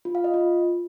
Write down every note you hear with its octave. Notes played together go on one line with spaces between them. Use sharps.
F4
F5
D#5
F4